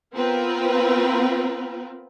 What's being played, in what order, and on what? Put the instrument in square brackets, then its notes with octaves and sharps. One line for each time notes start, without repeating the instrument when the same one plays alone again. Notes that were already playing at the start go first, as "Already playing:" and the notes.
[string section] B3 C4 F4 A#4 B4